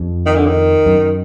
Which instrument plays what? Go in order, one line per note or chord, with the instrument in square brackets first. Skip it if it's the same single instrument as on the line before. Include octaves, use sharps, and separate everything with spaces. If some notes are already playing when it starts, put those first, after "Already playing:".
Already playing: [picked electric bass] F2
[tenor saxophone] D#3
D3
D#3
[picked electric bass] F#2